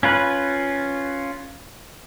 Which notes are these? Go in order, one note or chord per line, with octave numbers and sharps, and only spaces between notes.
C#4 F4 B4